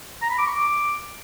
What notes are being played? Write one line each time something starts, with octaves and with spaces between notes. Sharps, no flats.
A#5
B5
D6
C#6
D6